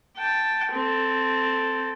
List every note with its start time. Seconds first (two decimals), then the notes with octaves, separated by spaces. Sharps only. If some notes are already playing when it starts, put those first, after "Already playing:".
0.18 G5 A5
0.72 C4 A4